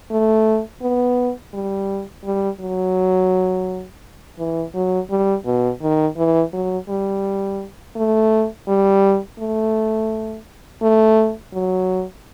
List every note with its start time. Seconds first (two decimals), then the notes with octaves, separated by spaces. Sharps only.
0.11 A3
0.81 B3
1.53 G3
2.24 G3
2.60 F#3
4.39 E3
4.75 F#3
5.10 G3
5.46 B2
5.82 D#3
6.17 E3
6.53 F#3
6.89 G3
7.96 A3
8.68 G3
9.39 A3
10.82 A3
11.54 F#3